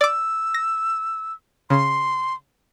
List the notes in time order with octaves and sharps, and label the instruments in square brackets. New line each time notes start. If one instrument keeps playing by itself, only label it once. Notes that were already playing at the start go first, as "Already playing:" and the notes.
[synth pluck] D5 D6 [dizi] E6
[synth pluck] A#6
[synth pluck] C#3 [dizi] C6